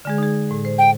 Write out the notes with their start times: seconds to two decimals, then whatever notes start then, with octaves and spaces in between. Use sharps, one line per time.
0.05 D3 G#3 G#4
0.18 D#4 G#4
0.51 A2
0.65 C5
0.79 G5